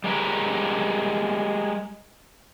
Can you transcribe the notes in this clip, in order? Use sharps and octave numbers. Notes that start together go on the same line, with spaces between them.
G3 G#3 A#4 B4